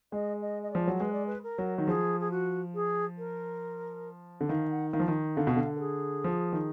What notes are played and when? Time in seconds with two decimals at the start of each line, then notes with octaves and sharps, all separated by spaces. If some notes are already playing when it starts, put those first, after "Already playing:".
0.12 G#3 D#5
0.42 D#5
0.63 D#5
0.71 F3 D5
0.87 F#3
1.00 G#3 B4
1.13 D5
1.27 B4
1.44 A#4
1.58 F#3
1.78 D#3
1.87 F3 G#4
2.20 G#4
2.31 F#4
2.74 G#4
3.18 A#4
4.41 D3
4.49 D#3 F5
4.71 F#5
4.92 D#3 F5
5.00 F3
5.08 D#3
5.36 D3 F5
5.47 B2
5.56 D3
5.76 A#4
5.80 G#4
6.24 F3
6.53 D#3